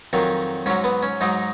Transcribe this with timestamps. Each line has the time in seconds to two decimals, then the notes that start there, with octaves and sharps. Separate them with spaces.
0.13 F2 D#3 F#3
0.66 G#2 F#3 C#4
0.84 B3
1.03 C#4
1.21 G#2 F#3 D#4